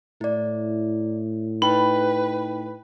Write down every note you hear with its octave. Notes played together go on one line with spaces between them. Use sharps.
A2 E4 D5
D#4 B4 G5 B5